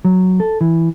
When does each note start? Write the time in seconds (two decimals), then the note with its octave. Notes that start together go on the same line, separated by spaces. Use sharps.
0.05 F#3
0.40 A4
0.61 E3